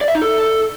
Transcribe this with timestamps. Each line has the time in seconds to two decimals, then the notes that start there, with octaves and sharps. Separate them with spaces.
0.01 D5
0.08 E5
0.15 D#4
0.21 A4